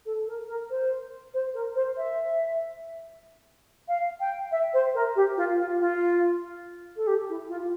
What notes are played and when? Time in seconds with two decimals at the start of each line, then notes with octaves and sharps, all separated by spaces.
0.06 A4
0.27 A#4
0.48 A#4
0.70 C5
1.34 C5
1.54 A#4
1.75 C5
1.97 E5
3.88 F5
4.20 G5
4.51 E5
4.74 C5
4.95 A#4
5.16 G4
5.37 F4
5.58 F4
5.80 F4
6.96 A4
7.07 G4
7.29 E4
7.49 F4